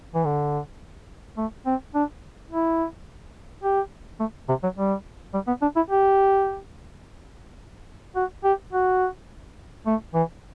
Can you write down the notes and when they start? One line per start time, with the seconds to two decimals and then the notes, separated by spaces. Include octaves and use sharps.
0.14 E3
0.25 D3
1.37 A3
1.66 C4
1.95 D4
2.51 E4
3.64 G4
4.20 A3
4.49 C3
4.63 F#3
4.77 G3
5.34 G3
5.47 B3
5.62 D4
5.76 E4
5.90 G4
8.16 F#4
8.44 G4
8.73 F#4
9.86 A3
10.14 E3